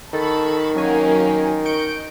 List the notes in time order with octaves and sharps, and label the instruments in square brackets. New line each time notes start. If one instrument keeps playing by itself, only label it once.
[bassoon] D#3 [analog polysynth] A4 [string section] A5 B5 C#6
[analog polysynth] F#3 F#4 G#5 [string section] A#3 C#4 D#4
[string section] D#5 [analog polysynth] C#6 G6 D7